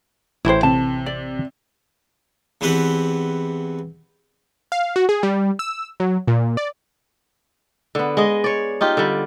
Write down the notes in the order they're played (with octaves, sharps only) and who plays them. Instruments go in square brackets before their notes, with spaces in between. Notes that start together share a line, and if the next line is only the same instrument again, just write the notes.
[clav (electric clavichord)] A1 A2 G5 [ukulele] E4 C5
[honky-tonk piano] C3 [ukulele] A5
[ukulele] D5
[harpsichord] E2 E3 C4 G4 B4 F#5
[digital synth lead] F5
F#4
G#4
G3
E6
F#3
A#2
D5
[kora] D3 B3
G#3 D#5
C#5 D5
D#4 F4 G4
D3 G3